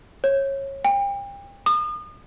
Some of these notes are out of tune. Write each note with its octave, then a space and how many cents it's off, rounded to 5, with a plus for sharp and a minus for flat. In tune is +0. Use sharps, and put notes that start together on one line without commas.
C#5 -20
G5 +35
D#6 -40